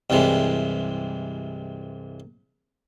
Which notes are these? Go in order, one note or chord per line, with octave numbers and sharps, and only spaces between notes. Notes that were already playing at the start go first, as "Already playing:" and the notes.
C2 G2 C3 E3 G#3